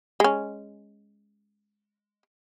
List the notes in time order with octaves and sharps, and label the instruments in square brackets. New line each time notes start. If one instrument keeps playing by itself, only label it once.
[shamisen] G#3 C#4